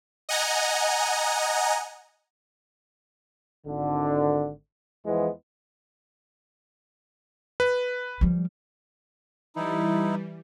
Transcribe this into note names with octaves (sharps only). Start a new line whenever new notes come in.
D#5 F#5 G#5 A#5
G#1 D3
E2 E3 F3 G#3 B3
B4
F3 G3
E3 G3 D#4 E4